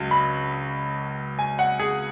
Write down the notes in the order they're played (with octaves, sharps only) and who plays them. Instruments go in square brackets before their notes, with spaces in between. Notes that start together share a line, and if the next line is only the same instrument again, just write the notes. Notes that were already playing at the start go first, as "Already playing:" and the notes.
Already playing: [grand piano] C#2 C#3 F#3
B5
G#5
F#5
G#4